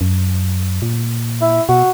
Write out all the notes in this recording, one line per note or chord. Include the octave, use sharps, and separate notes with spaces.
F#2
A#2
E4
B2 F#4